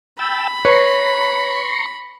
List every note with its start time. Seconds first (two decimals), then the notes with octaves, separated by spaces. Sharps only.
0.19 G5 A5 B5 E6
0.65 B4 C#5 A#5 C6 C#6